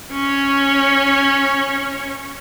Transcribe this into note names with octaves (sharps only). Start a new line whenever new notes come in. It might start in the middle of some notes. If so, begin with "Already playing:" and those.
C#4 C#5